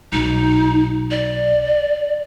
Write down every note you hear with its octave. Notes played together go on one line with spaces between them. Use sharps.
B1 A#2 D#4
D5